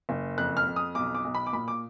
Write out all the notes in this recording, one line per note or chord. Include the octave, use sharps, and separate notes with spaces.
F#1
F2 F#6
F6
F2
D#6
B1 D6
D6
B1
B5
D6
A#2 B5
D6